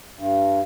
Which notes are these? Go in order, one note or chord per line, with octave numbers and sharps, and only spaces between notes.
G2